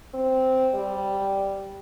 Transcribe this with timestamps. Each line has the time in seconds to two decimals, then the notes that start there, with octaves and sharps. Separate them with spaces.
0.14 C4
0.74 G3